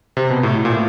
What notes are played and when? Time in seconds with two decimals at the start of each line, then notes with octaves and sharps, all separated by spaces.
0.17 C3
0.30 B2
0.43 A2
0.65 A#2
0.70 A2